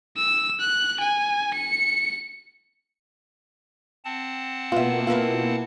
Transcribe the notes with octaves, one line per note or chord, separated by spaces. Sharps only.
E6
F#6
G#5
C#7
C4 F#5 A5
B2 A#3 B3 F4 E5
E4 F4 A#4 B4